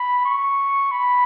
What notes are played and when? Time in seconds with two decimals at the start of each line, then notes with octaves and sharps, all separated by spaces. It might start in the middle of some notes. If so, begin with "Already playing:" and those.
Already playing: B5
0.25 C#6
0.91 B5